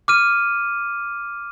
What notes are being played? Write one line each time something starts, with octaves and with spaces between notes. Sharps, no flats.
D6 F6 D#7